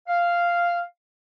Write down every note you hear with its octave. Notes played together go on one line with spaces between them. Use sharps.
F5